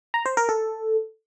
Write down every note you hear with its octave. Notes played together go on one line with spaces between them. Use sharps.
A#5
C5
A#4
A4